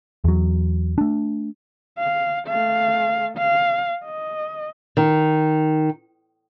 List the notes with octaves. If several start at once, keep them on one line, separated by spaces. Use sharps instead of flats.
E2 F#3
A3 D4
F5
A3 F5
F5
D#5
D#3